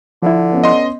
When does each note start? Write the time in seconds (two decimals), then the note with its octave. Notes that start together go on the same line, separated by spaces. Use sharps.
0.22 D3 F3 E4
0.52 B3 C#4
0.64 D#5 C6